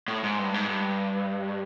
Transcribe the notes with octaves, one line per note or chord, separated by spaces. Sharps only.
A2
G#2
G2
G#2
G2